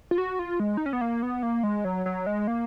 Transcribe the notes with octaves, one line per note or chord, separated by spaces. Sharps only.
F4
F#4
F4
G#3
D#4
C#4
B3
A#3
B3
A#3
G#3
F#3
F#3
G#3
A#3